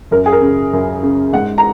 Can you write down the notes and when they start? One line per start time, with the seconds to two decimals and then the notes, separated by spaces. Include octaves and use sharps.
0.11 F#2 A#4
0.26 G#4
0.32 A#4
0.41 C#3
0.73 F#2
1.03 C#3
1.33 G#2 F#5
1.58 A#5